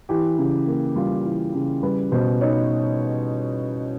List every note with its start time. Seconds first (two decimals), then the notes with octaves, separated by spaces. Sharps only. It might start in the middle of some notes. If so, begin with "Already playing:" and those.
0.09 E3 G4
0.38 C#3
0.67 A#3
0.96 G3 F4
1.25 E3
1.55 C#3
1.83 G3 B4
2.12 B2 C5
2.41 D#4 C#5